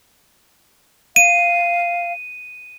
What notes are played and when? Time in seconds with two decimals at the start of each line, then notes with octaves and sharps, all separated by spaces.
1.16 F5 D#7